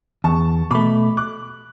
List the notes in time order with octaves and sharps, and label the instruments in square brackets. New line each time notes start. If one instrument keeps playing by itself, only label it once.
[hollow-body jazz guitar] E2 [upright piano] A5 C#6
[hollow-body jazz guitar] B2 A3 [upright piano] B5 D6
[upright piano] D6 F#6